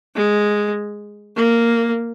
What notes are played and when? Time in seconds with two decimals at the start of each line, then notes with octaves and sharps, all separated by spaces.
0.16 G#3
1.36 A#3